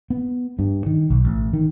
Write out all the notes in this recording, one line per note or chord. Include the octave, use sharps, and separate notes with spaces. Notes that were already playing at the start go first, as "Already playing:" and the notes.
B3
G2
D#3
B1
A1
D#3